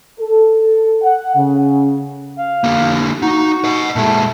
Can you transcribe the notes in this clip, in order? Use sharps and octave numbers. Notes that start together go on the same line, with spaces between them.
A4
F#5
C#3
F5
D3 A#3
D#4 F#4
D#5 F#5
A#2 G#3 A3